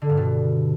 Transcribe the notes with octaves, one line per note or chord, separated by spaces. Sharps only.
D3
G2
B2